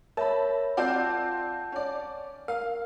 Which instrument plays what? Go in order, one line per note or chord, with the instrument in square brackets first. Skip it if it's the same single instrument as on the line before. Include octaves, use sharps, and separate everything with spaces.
[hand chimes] A#4 C#5 E5 [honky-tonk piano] A5 B5
[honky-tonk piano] C4 F4 D5 [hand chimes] F#5 A5 G6
[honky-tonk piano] C#4 D5
[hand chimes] A#4 [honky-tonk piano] F5